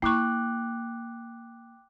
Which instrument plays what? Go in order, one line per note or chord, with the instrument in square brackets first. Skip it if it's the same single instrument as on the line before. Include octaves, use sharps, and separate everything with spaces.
[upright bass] A#3 [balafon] E4 C#6 [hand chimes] G5 D6 F#6